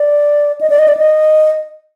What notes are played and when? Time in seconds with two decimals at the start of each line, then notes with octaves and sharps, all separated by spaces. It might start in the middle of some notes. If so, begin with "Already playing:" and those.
Already playing: D5
0.61 D#5
0.70 D5
0.79 D#5
0.88 D5
0.97 D#5